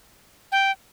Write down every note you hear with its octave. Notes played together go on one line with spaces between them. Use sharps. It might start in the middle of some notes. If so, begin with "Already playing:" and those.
G5